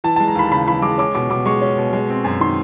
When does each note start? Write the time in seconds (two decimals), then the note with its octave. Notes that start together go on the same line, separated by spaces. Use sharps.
0.04 E3 A5
0.16 G#3 A5
0.28 A#5
0.35 D#2 B5
0.51 C#3 B5
0.66 E3 B5
0.82 G#3 D6
0.98 C#4 D6
1.15 B2 D6
1.30 B2 D6
1.45 G#3 C#6
1.62 C#4
1.78 B2
1.93 G#3
2.10 C4
2.24 F#2
2.41 D#3 C6